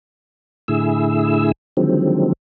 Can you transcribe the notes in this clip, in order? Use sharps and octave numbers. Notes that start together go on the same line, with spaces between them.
A2 D3 E4 G#4 E6
D3 D#3 F3 F#3 G#3 C4